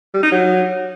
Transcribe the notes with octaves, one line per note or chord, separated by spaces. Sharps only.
G3
D#4
F#3